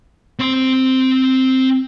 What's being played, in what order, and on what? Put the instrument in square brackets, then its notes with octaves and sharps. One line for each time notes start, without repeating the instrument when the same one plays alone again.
[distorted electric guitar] C4 C6